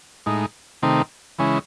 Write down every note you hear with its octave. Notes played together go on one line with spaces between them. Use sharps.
A2 G#3 D#4
C3 D#3 A3 C4 D#4
C#3 E3 G#3 C#4 E4